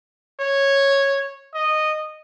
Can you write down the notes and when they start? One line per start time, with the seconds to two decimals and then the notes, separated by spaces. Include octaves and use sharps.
0.40 C#5
1.54 D#5